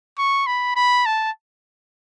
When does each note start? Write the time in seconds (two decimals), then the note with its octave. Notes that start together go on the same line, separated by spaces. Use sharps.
0.18 C#6
0.47 B5
0.76 B5
1.06 A5